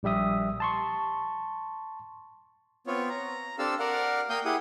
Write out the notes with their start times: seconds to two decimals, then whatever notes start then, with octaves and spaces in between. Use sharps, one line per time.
0.03 A#1 G3 G4 E5 D#6
0.60 A5 C6 C#6
2.87 B3 C4 F4 C#5
3.09 A#5
3.59 C4 D4 G4 A4 F5 E6
3.79 A#4 D5 F5 F#5
4.30 A#3 A#4 F5 G5 D#6 G6
4.45 E4 G4 G#4 F#5 D#6